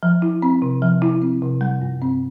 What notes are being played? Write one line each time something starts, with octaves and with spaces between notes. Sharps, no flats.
F3
E4
C4
C3
F3
E4
C4
C3
G3
G2
C4